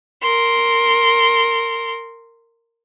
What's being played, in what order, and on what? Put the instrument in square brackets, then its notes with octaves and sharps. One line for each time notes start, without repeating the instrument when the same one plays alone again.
[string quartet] A#4 C6